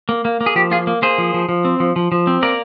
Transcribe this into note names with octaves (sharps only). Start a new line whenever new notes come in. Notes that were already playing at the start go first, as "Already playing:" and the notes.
A#3
A#3
A#3
G#4
F3 G4
A#3 F4 G#4
A#3
A#3 G#4 C5
F3
F3
F3
C4
F3
F3
F3
C4
A#3 A#4 D5